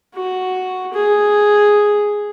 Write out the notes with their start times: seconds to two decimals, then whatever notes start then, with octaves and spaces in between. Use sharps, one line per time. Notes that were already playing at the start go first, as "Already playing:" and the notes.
0.15 F#4
0.93 G#4